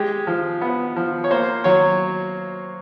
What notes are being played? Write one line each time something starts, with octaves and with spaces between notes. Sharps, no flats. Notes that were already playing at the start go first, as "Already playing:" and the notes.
Already playing: G#3 G4
F3
B3
F3
C#5
A#3 C5
F#3 C#5